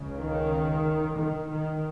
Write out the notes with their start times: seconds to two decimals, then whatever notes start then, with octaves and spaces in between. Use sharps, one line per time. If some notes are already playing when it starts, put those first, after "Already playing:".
Already playing: C#2 C#3
0.18 D#3
1.16 D#3
1.49 D#3